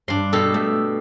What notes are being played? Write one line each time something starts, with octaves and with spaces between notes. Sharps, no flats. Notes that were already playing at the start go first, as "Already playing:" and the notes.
G2 D4 C6
B2 G4 A4
A3